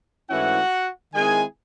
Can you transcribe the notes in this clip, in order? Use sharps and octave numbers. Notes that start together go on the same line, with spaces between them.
G#2 E3 A3 C#4 E4 F#4 F#5
D#3 G#3 C4 E4 G#4 G#5